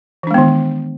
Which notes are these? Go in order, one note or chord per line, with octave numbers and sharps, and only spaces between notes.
D#3 E3 G#3 B3 D4